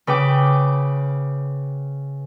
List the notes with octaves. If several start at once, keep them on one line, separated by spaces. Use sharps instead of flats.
C#3 B4 G5 D6